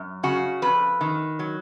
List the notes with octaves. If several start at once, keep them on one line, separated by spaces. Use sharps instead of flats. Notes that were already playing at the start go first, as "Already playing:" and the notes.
Already playing: F#2
C#3 F#4
F2 B4
D#3
F#3